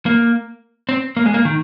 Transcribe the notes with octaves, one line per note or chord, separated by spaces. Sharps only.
A#3
C4
A#3
G#3
A#3
D#3